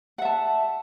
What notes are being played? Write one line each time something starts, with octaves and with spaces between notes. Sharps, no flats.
E5 F#5 A5